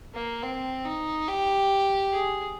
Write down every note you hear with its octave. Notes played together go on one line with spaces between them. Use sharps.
A#3
C4
D#4
G4
G#4